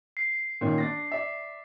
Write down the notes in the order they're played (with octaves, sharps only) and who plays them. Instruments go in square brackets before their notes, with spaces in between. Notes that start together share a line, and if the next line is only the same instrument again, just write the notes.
[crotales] C7
[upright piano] A#2 D#3 C#4
D4 A6 A#6
D5 E5